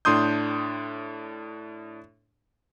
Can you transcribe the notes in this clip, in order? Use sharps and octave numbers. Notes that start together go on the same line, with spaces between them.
A2 D4 C6 D#6 G6